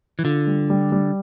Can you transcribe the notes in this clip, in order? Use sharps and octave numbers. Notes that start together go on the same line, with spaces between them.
E3
D3 F4
G3
G3
G3